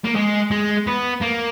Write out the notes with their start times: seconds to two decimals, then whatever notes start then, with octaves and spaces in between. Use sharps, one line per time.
0.05 A#3
0.16 G#3
0.51 G#3
0.87 B3
1.22 A#3